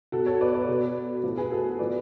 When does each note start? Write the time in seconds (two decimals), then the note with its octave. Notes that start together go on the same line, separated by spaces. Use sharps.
0.12 B2 F#4 A4
0.26 A4 C#5
0.41 B4 D5
0.54 B4 D5
0.68 B2
1.23 A2 F3
1.37 G#4 B4
1.52 F#4 A4
1.79 A2 F3 B4 D5